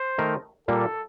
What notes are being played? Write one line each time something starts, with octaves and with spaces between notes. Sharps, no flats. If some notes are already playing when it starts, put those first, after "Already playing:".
Already playing: C5
D#3 A3 D#4 A#4
A#2 G3 A#3 A4